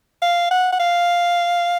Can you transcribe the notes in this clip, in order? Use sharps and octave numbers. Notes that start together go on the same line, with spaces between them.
F5
F#5
F#5
F5